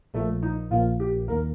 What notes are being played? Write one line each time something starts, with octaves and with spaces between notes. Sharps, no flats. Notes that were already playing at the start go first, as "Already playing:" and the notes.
A#1 A#2 F3 A3 A#3
D#4
A#1 A#2 F3 A#3 F4
G4
D#2 D#3 A#3 A#4